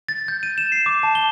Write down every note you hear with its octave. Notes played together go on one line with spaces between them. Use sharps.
A6
G6
D#7
E7
C7
D6
A5
G7